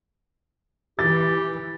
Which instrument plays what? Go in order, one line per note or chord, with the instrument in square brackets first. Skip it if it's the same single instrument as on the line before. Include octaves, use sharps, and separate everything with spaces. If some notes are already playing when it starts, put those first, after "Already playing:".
[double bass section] E3 [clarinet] G4 [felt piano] A6